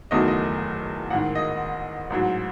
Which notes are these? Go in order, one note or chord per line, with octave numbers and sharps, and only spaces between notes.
F#1 E2 D#3 F#3 A3 D#5
D#5
A1 G#2 D#3 F#5
D#5
A1 G#2 F#3